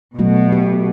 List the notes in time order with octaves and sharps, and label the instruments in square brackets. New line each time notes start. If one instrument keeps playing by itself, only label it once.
[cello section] B2 [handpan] F#3 A3 F#4
[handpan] G4